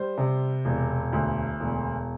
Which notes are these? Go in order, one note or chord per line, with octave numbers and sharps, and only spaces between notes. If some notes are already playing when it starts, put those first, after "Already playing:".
Already playing: G3 C5
C3
E1
D2
E1